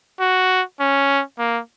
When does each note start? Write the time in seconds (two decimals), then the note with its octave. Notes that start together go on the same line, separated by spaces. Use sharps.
0.20 F#4
0.80 C#4
1.39 A#3